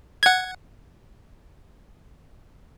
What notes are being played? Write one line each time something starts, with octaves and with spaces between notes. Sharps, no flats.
F#5 G#6